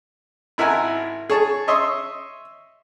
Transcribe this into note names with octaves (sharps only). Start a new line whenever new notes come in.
G#1 E4 A#4 F#5 G#5
G#4 C#5 A5
C#5 D#5 E5 C6